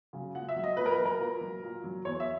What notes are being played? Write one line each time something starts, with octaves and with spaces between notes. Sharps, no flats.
C#3 F#3
A#2 F#5
E5
F#3
D#5
A#2 B4
A#4
B4
F#3
A#4
A#2
F#3
A#2
F#3
E2 C#5
E5